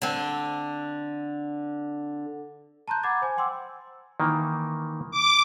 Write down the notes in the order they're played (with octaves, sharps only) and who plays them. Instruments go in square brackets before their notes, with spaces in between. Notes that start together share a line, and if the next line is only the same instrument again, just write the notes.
[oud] D3 C4
[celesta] A5 A#5 C6 F#6 G6
F#5 A#5 B5 D6 G#6 A6
C5 G#5
F#5 G5 C6 D6 E6
[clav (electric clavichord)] D#3 E3 A#3
[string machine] D6